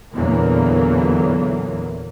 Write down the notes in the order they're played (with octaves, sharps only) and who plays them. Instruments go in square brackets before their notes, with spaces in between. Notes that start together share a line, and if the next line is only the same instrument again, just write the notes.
[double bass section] E2 A#2 D3 E3 F#3 A#3